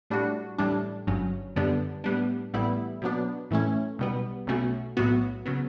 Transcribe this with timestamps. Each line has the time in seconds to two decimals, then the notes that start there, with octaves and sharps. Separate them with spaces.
0.10 A2 G3 D4 F#4
0.58 A1 A2 G3 D4
1.07 G1 G2 F#3 C#4
1.56 F#2 D3 G3 B3 D4
2.04 A2 G3 B3 D4
2.54 A1 A2 G3 B3 E4
3.02 B2 F#3 B3 D4
3.51 A2 E3 A3 C#4
3.99 B1 B2 G3 B3
4.47 B1 B2 A3 C#4 F#4
4.97 B1 A2 F#3 B3 F#4
5.46 C#3 F#3 B3